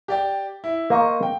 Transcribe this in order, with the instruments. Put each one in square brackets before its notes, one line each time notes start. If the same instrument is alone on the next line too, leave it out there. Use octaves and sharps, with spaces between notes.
[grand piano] G4 D5 G5
E4
[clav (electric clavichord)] A#3 [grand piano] C5 D#5 C#6
[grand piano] G5